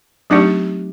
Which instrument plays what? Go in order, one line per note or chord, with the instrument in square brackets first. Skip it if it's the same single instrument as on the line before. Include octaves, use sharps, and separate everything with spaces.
[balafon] F#3 A3 C4 D#4 G4 [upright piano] D4